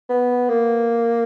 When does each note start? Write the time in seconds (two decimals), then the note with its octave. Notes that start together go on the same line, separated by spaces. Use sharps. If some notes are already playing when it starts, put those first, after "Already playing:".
0.09 B3
0.49 A#3